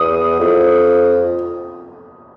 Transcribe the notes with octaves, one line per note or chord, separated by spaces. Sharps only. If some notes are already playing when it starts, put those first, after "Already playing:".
Already playing: E2 D#6
F2